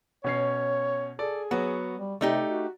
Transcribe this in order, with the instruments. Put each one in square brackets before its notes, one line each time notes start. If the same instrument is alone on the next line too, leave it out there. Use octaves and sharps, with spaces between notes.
[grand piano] B2 C#4 C7 [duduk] C#5
[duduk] G#4 [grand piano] A4 D5
[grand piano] F#3 B3 [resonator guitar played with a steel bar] F#4
[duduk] G3
[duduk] C3 [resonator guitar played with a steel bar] A3 D#4 G4 [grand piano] D5
[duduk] F#4